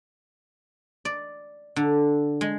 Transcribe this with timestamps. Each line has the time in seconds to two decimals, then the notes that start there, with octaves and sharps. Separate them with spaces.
1.05 D5
1.76 D3
2.41 G#3